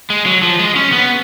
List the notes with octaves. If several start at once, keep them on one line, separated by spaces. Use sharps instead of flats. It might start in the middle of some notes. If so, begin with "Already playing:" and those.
G#3
F#3
F3
G#3
C#4
B3